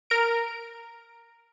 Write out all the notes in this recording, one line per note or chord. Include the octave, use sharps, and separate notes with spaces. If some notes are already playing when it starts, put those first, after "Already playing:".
A#4 D7